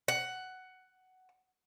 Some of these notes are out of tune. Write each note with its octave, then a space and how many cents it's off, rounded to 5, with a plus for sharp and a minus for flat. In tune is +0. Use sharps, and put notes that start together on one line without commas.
F#5 +10